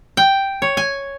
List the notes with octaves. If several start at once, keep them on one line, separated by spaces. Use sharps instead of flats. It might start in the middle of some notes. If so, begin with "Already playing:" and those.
G5
C#5
G#5